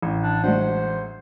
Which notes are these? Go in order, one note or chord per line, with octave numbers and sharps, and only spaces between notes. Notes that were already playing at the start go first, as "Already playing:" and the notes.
A1
D4
G#3 A3 D4 F#4 C5 F#5